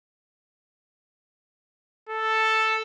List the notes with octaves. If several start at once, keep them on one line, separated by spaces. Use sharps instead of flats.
A4